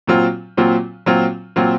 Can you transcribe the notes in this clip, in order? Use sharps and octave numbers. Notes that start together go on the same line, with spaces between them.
A#2 F#3 C4 F4
A#2 F#3 C4 F4
A#2 F#3 C4 F4
A#2 F#3 C4 F4